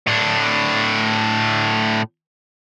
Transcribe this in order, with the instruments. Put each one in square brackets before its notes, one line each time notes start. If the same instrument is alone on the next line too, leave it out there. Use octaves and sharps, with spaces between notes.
[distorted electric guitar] A2 D4